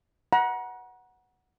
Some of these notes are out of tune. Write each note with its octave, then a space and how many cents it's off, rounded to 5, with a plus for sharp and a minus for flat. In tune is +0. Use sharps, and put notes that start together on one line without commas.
F#5 +0 A#5 +40